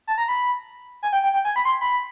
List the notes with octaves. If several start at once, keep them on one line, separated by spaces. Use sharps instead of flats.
A5
A#5
B5
G#5
G5
G5
G5
G#5
B5
C6
B5